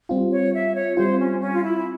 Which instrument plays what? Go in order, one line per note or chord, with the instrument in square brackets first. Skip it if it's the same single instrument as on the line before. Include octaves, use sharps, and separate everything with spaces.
[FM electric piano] G3 C4 F4
[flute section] C#5
E5
C#5
[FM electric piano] G3 C4 F4 [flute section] C5
[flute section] C#4
C#4
F4
E4